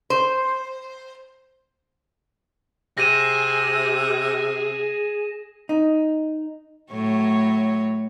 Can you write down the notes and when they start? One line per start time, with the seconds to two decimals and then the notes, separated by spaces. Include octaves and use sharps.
0.10 C5
2.98 C3 G#4 A#6 D#7 E7
5.69 D#4
6.91 A2 F#3 C#5